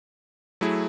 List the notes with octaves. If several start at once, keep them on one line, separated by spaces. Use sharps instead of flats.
F#3 A3 E4 G#4